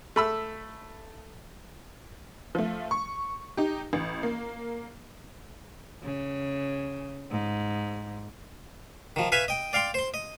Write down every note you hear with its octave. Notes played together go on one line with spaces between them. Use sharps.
A3 B5 E6
F3 A3
C#6
D#4 G4
A1
A#3
C#3
G#2
D#3 F3
B4 E5 F5 G#5 C#6
D#5 G5
D5 F5 G5 C6
C5 C6
D#5